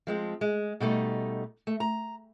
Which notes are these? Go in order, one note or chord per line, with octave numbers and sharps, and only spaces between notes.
F3 G#3 C4
G#3
B2 G3 A3 D#4
A3
A#5